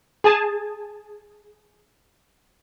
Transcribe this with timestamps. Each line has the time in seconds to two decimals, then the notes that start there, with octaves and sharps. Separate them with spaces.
0.24 G#4 G#5 A5